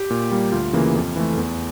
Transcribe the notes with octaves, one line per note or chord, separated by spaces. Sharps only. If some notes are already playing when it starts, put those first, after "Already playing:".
Already playing: G4
A#2
G3 A#3
D2 F4
C#3 E3 A#3
F2
E3 A3
E2